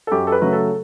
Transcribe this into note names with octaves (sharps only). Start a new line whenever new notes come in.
A4
F#2 G4
A4
B4
C#3 F#3 A3
A4